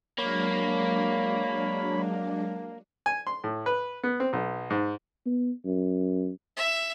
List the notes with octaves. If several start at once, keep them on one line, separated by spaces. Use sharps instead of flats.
F#3 G#3 A#3 D4 C#5 B5
G#5
C6
A2
B4
B3
C4
B1
G#2
B3
F#2
E5